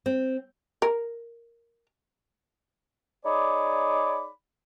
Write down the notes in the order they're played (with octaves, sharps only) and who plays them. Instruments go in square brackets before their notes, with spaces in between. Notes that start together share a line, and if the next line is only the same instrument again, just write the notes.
[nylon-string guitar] C4
[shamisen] A#4
[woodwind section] D#4 G#4 C#5 D5 B5 D6